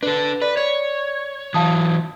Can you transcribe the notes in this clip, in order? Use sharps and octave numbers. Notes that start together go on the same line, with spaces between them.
D4 A4 B4
B4 D5
C#5
E3 F#3 F5 A5 D#6